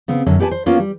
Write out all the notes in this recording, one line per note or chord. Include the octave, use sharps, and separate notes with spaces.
C#3 B3 C4
F#2 D3 C#4
B3 G4 B4 D5 G#5 A5
C5
A#3 B3 C#4 F4
G3